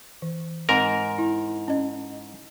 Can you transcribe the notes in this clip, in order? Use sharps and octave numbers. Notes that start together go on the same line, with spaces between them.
E3
G#2 C4 A#4
E4
C#4 D#5